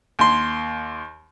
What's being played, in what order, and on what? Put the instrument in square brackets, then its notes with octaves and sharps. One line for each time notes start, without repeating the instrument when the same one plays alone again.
[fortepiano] D#2 C6